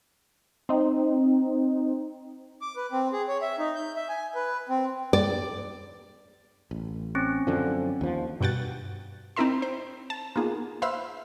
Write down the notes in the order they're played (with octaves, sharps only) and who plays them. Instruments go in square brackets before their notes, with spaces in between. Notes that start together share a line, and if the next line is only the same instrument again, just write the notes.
[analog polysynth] C4 D#4
[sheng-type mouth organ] D6
B4
C4
G#4
C#5
E5
D#4
G6
E5
G#5
B4
C4
[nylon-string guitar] D5
[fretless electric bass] A1
[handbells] C4 C#4
[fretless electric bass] F#2 D3 F3
D#2 F3
[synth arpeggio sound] G2 B2 F#5 G5 A6
C4 D#4 E4 A#4 E5 C6
C5
A5
A#3 B3 D#4 F4 G#4
B4 C5 E5 F5 E6